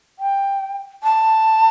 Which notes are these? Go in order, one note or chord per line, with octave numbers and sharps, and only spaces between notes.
G5
A5